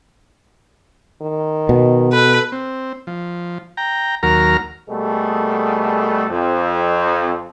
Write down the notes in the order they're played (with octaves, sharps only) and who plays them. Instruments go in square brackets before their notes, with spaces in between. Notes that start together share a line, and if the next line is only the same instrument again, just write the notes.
[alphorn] D#3
[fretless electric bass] B2
[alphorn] A4 [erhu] B4
[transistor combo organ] C4
F3
G5 A#5
D#2 F#3 A#4 A#5 F6
[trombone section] B2 G3 A3 A#3 G#4 A4
F2